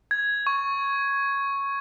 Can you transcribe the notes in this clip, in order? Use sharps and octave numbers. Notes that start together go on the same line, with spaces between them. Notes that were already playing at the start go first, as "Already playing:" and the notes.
G#6
C#6